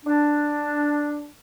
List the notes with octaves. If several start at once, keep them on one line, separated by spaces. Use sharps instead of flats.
D4